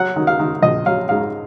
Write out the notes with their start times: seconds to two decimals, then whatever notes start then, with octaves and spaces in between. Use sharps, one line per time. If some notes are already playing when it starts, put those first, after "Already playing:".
Already playing: F#3 F#5
0.16 D#3
0.27 F5
0.39 D#3
0.62 A#1 D#5
0.86 F#3 F5
1.09 G#2 F5